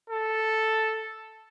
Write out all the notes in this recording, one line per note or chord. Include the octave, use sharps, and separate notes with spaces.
A4